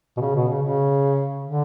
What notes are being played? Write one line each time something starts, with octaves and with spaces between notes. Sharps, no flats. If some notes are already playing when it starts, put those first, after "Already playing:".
B2
C#3
B2
C#3
C#3
D3